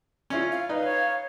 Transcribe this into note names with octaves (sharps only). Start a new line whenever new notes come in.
C#4 E4 F4
F5
D#4 B4
C#5